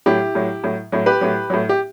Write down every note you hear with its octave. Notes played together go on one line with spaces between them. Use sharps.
A2 F#3 E4 G4
A2 F#3
A2 F#3
A2 F#3
G4 B4
A2 F#3
A2 F#3
G4